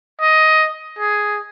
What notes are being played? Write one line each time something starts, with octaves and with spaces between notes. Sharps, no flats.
D#5
G#4